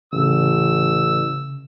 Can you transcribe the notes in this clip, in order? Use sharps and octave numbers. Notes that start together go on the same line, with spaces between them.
A1 C#3 E6